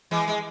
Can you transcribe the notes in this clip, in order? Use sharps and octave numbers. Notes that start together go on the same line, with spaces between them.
E3 G#3
G#3